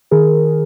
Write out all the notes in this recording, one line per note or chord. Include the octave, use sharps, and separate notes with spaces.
D#3 G#4 A#4